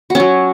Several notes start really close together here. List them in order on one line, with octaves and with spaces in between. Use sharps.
F#4 C#4 F#3